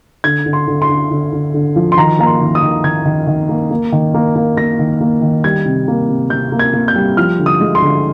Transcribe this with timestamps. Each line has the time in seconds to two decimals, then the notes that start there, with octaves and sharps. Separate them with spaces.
0.24 D3 G#6
0.46 D3
0.53 C6
0.68 D3
0.82 C6
0.89 D3
1.11 D3
1.33 D3
1.54 D3
1.76 F3
1.92 C6
1.97 D#3 A#5
2.19 A#3 A#5
2.27 C6
2.41 D#3
2.55 D#6
2.63 D#3
2.84 D#3 G#6
3.06 D#3
3.27 D#3
3.49 A#3
3.71 A#3
3.92 D#3
4.14 A#3
4.36 A#3
4.57 A#3 A#6
4.79 D#3
5.01 A#3
5.22 D#3
5.44 G3 G#6
5.66 C3
5.88 A#3
6.09 C3
6.30 C3 G6
6.52 A#3
6.59 G#6
6.74 A#3
6.88 G6
6.95 G3
7.17 F3 F6
7.39 D3
7.46 D#6
7.61 G#3
7.75 C6
7.82 D3